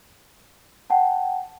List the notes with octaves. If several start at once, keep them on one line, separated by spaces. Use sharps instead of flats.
F#5 G5 A5